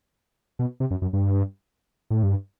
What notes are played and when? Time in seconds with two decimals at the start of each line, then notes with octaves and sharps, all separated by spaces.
0.59 B2
0.80 C3
0.91 F#2
1.02 F#2
1.13 G2
2.10 A2
2.23 G2